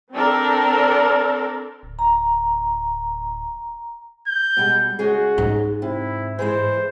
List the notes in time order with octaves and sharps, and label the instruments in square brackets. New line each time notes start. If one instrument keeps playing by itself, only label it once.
[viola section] C4 D4 A4 A#4
[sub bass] D1
[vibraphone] A#5
[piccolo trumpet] G6
[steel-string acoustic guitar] B2 G3 G#3
[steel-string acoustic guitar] C#3 G#3 G#4 [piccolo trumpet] F#4
[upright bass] G#2
[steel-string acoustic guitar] C3 [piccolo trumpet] E4
[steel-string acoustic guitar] E3 G#3 E4 [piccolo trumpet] C5